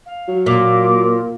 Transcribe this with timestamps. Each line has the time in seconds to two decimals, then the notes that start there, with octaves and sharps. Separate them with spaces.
0.06 F5
0.28 F#3
0.46 A#2 D6
1.03 A#4